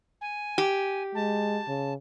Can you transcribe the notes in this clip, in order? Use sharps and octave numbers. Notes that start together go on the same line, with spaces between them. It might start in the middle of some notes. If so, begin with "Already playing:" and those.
G#5
G4
G#3 A5
C#3